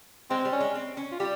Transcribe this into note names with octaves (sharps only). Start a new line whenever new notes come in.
G#3 C4
G3
C#4
G#3
C4
C#4
F4
G3 G4